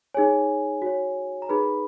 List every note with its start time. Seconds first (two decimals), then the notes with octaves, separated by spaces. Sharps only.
0.14 D#4 G#4 C#5 G#5
0.82 F#4 C#5
1.42 A#5
1.49 D#4 G#4 B4 B5